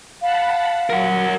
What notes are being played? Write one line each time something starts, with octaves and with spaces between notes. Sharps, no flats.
F5 F#5 A5 B5
F#3 A#4 F#5